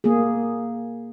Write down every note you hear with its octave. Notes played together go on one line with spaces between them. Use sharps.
A#3 G#4